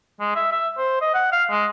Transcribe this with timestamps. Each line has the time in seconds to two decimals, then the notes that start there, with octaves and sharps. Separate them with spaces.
0.20 G#3
0.36 E5
0.52 E5
0.78 C5
1.01 D#5
1.14 F#5
1.32 F5
1.50 G#3